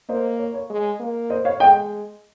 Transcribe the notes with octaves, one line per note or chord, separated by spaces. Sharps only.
A#3 C5 D#5
C#5
C#5
G#3
A#3
C5 D#5
C#5 F5
G#3 D#5 G5